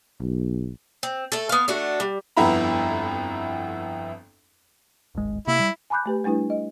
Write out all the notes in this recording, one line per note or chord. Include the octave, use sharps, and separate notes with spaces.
B1
C4
A3 A4
B3 F5
A3 D4 F#4
G3
G1 F2 B3 E4 A#5 B5
D1 G#1 G#3
C3 A#3 E4
G3
G#5 A5 B5 D6 F#6 G6
A3 G4 B4
G3 A3 D4 E4 B4
D#5